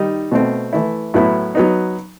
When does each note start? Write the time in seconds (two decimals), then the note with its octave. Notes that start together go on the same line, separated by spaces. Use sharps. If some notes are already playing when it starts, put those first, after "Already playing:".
Already playing: D#3 G3 D#4
0.32 B2 A3 C4
0.73 E3 A3 E4
1.14 A2 F#3 B3 E4
1.55 F#3 B3 D#4